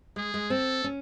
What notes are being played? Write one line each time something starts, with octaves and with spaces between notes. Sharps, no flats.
G#3 G#4
G#3
C4 A4
C#4